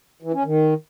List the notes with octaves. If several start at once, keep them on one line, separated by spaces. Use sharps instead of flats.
E3
C#4
D#3